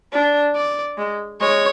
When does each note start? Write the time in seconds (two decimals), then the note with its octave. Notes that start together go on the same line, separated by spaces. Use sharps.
0.12 D4
0.55 D5
0.98 G#3
1.41 G#3 C#5